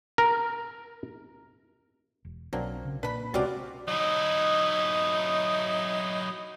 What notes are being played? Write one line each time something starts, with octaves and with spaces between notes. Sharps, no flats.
A#4
E1
B1 F#3 A#3 C4 D4
C#3
A#2 D4 B4 B5
C#2 C3 C4 C#4 F4 F#4 D5
F#3 D#4 E4